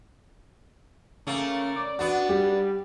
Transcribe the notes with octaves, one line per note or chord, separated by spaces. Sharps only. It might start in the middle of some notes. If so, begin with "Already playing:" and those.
C#3 A3 A#3
D5
B3 D4 F#4
G3 G4